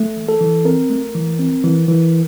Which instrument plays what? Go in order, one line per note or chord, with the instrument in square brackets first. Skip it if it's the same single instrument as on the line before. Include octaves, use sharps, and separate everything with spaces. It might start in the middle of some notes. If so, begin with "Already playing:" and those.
Already playing: [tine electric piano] A3
E3
A4
E3
C4 A#4
A3
E3
C4
E3
E3